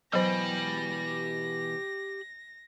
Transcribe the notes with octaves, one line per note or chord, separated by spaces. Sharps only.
B2 E3 F#3 G4 G#4 C5 B5 A#6